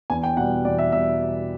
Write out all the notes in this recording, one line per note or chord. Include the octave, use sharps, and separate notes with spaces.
E2 G#5
G5
B2 G3 F#5
E2 D5
E5
B2 G3 E5